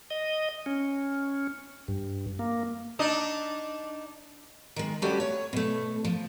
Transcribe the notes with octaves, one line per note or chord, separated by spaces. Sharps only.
D#5
C#4
G2
A#3
D4 D#4 D#5
D#3 G#3
G3 A3 B3 C#4 F#4 G4
C#5
B2 A3
F3